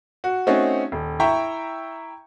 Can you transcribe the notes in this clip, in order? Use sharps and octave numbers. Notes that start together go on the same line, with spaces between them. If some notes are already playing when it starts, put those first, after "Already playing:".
F#4
A3 C4 C#4 D#4 F#4
D#1
E4 E5 G5 A#5 C#6